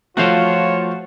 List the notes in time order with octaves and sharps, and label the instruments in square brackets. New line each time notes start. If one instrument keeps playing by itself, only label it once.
[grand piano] F3 A3 [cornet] F4 [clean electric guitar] F#4 C5 F5 [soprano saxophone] C#5